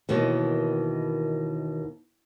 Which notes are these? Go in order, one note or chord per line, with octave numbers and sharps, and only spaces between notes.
D#2 B2 D#3 E3